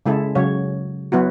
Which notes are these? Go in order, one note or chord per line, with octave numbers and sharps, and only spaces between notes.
C#3 G#3 E4 A4
C#3 F#3 C#5
F#3 B3 E4 F#4